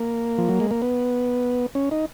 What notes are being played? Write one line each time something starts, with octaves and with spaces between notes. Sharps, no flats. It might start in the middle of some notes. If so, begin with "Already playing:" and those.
Already playing: A#3
F3
F#3
G#3
A#3
B3
C#4
D#4